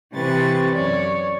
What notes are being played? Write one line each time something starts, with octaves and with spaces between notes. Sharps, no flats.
C3 E3 C4 B4 C#6 A6
F#2 C#5 D5